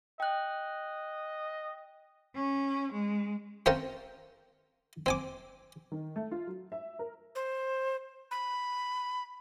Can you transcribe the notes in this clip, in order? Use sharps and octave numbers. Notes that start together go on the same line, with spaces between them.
D#5 G5 F#6
C#4
G#3
C4 C#4 A#4 F5 G5 A5
C4 G#5 D6
D#3
A3
F4
F#3
E5
A#4
C5
B5